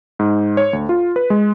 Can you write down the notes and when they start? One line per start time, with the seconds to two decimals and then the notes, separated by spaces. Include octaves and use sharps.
0.19 G#2
0.57 C#5
0.73 D2
0.89 F4
1.16 B4
1.30 G#3